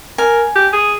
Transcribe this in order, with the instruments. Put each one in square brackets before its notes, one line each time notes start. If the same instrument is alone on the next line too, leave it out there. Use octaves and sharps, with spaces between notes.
[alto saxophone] A#4 [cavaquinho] G#5
[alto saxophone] G4
G#4